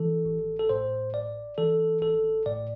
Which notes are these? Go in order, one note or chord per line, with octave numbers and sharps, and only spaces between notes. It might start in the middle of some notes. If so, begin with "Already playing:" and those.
Already playing: E3 A4
A1
A4
A2 C5
A1 D5
E3 A4
A1 A4
A2 D5